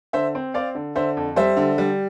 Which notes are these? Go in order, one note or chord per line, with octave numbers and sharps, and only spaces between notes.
D3 C5 E5
C4
C4 D5 F5
D3
D3 C5 E5
F2
G3 C5 E5
D3
G3